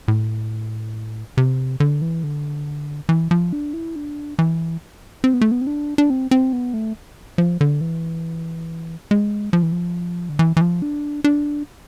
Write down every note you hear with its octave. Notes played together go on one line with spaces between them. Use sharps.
A2
C3
D3
E3
D3
E3
F3
D4
E4
D4
E3
C4
B3
A3
B3
C4
D4
D4
C4
C4
B3
A3
F3
D3
E3
G#3
F3
E3
F3
D3
E3
E3
F3
D4
D4